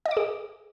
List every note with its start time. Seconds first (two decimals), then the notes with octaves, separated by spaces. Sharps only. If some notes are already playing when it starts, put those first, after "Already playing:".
0.06 D#5
0.11 D6
0.17 G#4